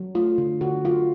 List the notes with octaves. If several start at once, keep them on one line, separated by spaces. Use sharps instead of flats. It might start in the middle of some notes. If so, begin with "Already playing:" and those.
Already playing: F#3
A3 F4
D3
D3 F#4
F#3 F4